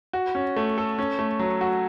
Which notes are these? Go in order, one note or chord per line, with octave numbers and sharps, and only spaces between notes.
F#4
C#4
A3
A4
C#4
A3
F#3
F#4